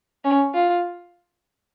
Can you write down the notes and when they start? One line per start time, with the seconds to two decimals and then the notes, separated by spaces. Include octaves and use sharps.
0.25 C#4
0.54 F4